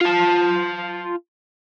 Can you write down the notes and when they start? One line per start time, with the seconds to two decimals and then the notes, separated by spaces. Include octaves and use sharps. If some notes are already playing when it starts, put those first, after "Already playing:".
0.01 F4 A5